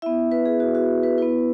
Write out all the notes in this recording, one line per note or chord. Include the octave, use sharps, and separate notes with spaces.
B3 E4 E5
B4
G#4
F#4
F#4
B4
B3 E4 B4